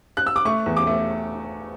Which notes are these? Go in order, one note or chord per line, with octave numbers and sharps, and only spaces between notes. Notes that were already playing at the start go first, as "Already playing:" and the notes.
F#6
E6
D6
A3 C#6
E2
D6
A3